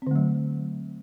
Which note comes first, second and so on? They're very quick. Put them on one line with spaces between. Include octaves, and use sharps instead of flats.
C4 D3 A3 F#3